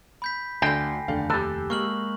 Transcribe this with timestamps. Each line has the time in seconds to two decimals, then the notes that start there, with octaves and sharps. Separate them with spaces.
0.22 B5 G6 B6
0.62 D2 D3 G5 G#5 A#6 C7
1.08 F1 D#2 D3 A3 D4 F5
1.30 G4 A4 E6 F#6
1.70 G#3 A#3 C#6 F6 F#7